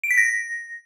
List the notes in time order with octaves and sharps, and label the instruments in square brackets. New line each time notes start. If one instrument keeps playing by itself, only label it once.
[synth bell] D7
B6
A#6